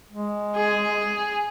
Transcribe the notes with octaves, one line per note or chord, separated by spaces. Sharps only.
G#3
G#4